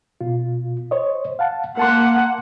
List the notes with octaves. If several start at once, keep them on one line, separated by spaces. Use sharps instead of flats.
B2 F4
C5 C#5 D#5
F5 F#5 A5
A#3 A#4 F#5 A5 C6